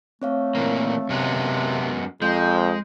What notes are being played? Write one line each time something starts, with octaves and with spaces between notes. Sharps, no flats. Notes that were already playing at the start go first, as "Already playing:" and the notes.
A3 C4 C#5 F5
A#2 E3 A#3
F#2 C3 G#3 B3
F2 G#3 C5 G6